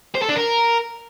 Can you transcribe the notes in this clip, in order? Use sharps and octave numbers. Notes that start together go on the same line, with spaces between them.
C5
A4
D4
A#4